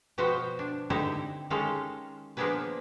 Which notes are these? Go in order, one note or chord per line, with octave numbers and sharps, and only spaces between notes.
B2 F3 F#4 B4 C5 G5
D4
D3 C4 D#4 E4 G4
D#3 G#3 C#4 F4 G4 A4
F3 A#3 B3 D4 G#4 B4